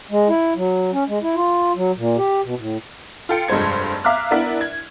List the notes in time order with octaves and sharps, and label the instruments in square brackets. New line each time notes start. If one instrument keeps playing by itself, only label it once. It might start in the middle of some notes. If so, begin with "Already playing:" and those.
[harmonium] G#3
E4
F#3
C#4
G#3
E4
F4
F#3
A#2
G4
B2
A2
[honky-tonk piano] F4 A4 G5 C#7
F1 G2 G#3 C5 G#6
E5 F5 A#5 D6 F6 F#6
B3 D4 E4 A#4 E5
G#6